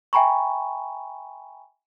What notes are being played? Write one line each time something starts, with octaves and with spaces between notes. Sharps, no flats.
E5 G5 G#5 A#5 B5 C#6